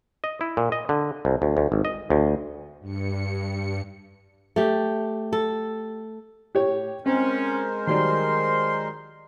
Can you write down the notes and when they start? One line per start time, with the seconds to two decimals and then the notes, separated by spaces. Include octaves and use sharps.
0.24 D#5
0.41 E4
0.57 A#2
0.72 D#5
0.89 D3
1.25 C2
1.42 D2
1.57 D2
1.72 G#1
1.85 D#5
2.10 D2
2.81 G2 C#7
4.56 A3 G4
5.33 A4
6.55 A2 G4 C#5
7.06 G#3 C4 C#4 A#4 C5
7.87 D#3 F#3 G3 C6